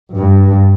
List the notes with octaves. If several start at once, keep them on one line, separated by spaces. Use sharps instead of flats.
G2